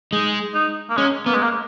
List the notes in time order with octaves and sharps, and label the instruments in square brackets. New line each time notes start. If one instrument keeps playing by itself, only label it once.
[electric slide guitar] G#3 [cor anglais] D#4
[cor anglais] D#4
A#3
[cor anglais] G#3 [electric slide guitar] C#4
[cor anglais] A#3 [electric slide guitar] B3
[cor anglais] G#3
A#3